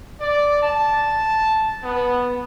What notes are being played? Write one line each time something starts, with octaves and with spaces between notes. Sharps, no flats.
D5
A5
B3